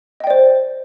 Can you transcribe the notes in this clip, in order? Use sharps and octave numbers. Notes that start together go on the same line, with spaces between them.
C5 D5 D#5 G5